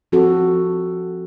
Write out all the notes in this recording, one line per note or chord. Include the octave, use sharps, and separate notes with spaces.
F3 C4 F#4 A4